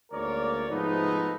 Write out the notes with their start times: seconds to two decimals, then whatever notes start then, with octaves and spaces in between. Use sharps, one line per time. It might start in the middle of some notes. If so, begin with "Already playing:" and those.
0.12 D2 G#2 A#3 A#4 C#5 D5
0.69 G#2 C3 F3 A3 B3 D#4